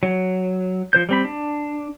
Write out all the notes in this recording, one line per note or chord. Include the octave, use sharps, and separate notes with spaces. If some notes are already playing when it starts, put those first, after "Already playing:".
F#3
F3 C5 G6
G3 C4 B5
D4